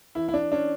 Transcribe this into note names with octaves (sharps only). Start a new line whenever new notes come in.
E3 E4
E4
D4
C#4 D4